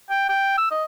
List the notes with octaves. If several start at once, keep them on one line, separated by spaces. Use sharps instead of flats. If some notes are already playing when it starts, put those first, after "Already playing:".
G5
G5
E6
D#5